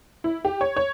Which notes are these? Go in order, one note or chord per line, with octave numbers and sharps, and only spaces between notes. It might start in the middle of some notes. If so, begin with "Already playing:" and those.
E4
G4
C#5
C#5